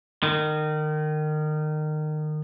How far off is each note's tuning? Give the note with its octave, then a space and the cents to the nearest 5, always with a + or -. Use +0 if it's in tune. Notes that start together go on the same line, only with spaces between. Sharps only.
D#3 -25